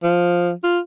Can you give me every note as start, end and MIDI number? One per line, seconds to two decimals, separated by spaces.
0.03 0.52 53
0.63 0.79 65